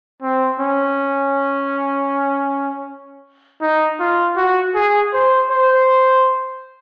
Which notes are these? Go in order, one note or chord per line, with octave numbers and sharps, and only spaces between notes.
C4
C#4
D#4
F4
F#4
G#4
C5
C5